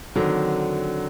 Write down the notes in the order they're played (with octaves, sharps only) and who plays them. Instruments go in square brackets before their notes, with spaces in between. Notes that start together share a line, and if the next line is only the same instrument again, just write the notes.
[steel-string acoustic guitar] D3 [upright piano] D#3 F#3 C4